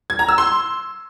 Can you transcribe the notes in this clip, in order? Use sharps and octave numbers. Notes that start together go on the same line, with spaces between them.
G#6
A#5
E6
C6